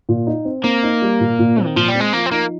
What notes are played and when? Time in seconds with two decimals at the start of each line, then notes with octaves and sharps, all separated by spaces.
0.09 A#2
0.27 D#4
0.45 C4
0.64 A#3 C4
0.83 D#4
1.02 G3
1.20 A#2
1.39 A#2
1.57 C4
1.65 D#3
1.76 A#2 F3
1.89 G3
1.95 C4
2.00 G#3
2.13 F3 A#3
2.26 C4
2.31 A#3 D#4